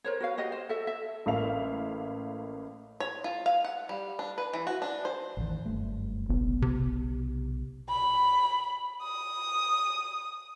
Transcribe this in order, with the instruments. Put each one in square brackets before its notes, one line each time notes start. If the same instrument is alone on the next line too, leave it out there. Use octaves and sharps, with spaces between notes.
[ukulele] A#4 C5 C#5
F#4 B4 F5
F#4 G4 D#5
C5
A4 E5
E5
[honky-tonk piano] A1 A2 A#3 E5 F5 F7
[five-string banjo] C#5
F4
F5
F#5
G3
D4
B4
E3
F#4
D4
C5
[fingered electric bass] A1 E2 D#3
F#1 G2 A3
[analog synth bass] F#1 [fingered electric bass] B1 B3
[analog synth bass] C3
[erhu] B5
D#6